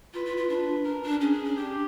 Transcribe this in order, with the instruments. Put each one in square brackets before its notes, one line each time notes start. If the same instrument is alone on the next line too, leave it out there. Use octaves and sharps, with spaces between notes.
[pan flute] F4 [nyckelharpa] B4
[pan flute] F4
F4
[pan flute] D4 [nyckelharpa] B4
[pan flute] D4 [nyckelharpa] A#4
[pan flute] D4
[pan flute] C#4 [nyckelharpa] G#4
[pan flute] D4
C#4
[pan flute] D4 [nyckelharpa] G4